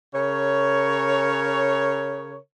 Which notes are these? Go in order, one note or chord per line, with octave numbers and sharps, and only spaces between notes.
C#3 A#4 C#5